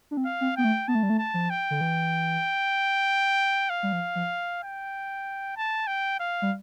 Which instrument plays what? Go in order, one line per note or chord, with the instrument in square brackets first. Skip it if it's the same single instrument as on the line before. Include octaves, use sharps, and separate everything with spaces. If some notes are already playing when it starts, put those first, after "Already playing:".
[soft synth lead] D4
C4
[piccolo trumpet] F5
[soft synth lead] C4
[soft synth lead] B3 [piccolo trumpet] G5
[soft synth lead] A3
[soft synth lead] B3 [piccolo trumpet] A5
[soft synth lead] A3
G3
A3
[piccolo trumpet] A5
[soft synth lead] F3
[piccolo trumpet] G5
[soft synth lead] D3
E3
[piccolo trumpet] F5
[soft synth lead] G3
F3
F3
[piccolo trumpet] G5
A5
G5
F5
[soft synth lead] G3